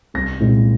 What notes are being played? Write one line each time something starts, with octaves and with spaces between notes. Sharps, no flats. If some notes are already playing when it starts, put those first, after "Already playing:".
C2 A#6
A#2 G#3 C4 E4